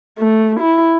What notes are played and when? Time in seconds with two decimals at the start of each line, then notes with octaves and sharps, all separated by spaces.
0.19 A3
0.60 E4